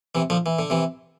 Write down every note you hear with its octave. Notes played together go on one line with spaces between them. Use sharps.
C3 E3
D3 F3
E3
D3
C3 E3